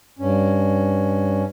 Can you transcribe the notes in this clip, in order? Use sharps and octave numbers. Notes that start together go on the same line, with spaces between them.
G2 C#4